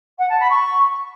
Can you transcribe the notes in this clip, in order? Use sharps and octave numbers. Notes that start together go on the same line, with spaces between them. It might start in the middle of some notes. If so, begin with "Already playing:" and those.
F#5
A5
B5
C#6